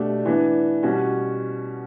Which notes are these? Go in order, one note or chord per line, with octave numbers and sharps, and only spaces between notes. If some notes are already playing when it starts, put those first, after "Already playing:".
Already playing: B2 A3 D4 G4
E3 B3 D4
B2 G3 C#4 F#4